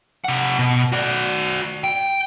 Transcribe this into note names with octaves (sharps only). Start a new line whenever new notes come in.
C3 F#5
B2
F#4 D5
G5